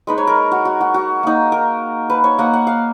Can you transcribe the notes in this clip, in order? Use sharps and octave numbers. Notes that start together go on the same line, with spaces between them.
G#3 D#4 B4
C#5
A#4
F#4
F#4
F#4
F#4
A#3 D#4
A#4
B4
C#5
A#3 D#4 F#5
F#5
F5